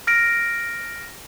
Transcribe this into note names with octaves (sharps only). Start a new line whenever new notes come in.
F6 A#6 D7